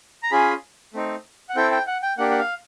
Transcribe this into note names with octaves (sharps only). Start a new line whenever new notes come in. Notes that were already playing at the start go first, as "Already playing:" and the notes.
A#5
C#4 F4 G#4 B5
A3 C4 D#4
F#5
C4 E4 A4 G5
G5
F#5
G5
A#3 D4 G4 F#5
F#5
F5